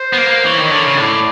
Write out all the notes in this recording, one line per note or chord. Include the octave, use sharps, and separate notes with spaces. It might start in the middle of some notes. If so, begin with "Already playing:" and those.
Already playing: C5
B3
A#3
E3 C#5
D#3
D3
C#3
A2 D5